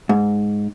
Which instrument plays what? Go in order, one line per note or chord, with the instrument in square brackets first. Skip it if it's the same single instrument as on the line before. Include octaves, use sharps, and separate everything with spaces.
[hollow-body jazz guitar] G#2